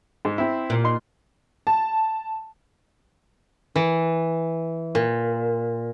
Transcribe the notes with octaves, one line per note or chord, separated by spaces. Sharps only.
G#2 G#3
C4 E4
A#2
D#4 C6
A5
E3
A#2